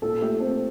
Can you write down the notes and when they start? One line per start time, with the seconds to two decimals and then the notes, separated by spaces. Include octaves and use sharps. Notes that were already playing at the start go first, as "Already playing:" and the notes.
0.02 A#2 A4
0.22 A3 G4
0.40 C4 A4